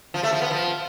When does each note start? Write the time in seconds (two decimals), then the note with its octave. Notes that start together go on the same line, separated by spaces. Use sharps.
0.14 F3
0.23 A3
0.32 F3
0.42 B3
0.51 F3